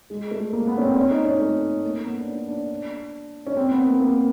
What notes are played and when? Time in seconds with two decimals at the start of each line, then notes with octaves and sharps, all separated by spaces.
0.10 G#3
0.31 A3
0.53 A#3
0.67 B3
0.78 C#4
0.82 C4
0.96 C#4
1.11 D#4
1.25 C#4
1.39 A3
1.83 A#3
2.04 B3
2.20 D4
2.27 C#4
2.48 D4
3.47 C#4
3.57 C4
3.71 B3
3.86 A#3
4.00 A#3